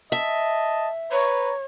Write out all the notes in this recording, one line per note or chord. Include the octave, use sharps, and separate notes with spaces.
D#5 E5 A5
B4 C#5 A#5